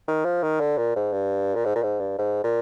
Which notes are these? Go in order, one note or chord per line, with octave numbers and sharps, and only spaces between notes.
D#3
F3
D#3
D3
A#2
G#2
G2
A#2
G#2
A#2
G#2
G2
G#2
A#2